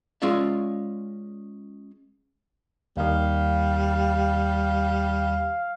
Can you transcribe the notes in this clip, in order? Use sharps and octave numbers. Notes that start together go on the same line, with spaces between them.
G#3 C#4 F4 D5 E5
D#2 D#3 G3 F5